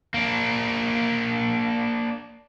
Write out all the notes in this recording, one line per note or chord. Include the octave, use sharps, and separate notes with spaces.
A#3 D4